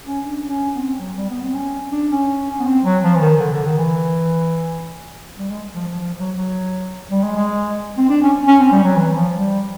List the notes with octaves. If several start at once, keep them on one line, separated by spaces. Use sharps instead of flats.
C#4
D4
C#4
B3
C4
F#3
G3
B3
C4
C#4
D4
C#4
B3
C4
F#3
F3
E3
D#3
D3
D3
D#3
E3
G3
G#3
F3
F3
F3
F#3
F#3
G3
G#3
G#3
C4
D4
C#4
C#4
C4
G3
F#3
E3
F3
G3